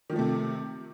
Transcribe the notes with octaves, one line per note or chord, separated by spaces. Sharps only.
C3 D#3 F3 A3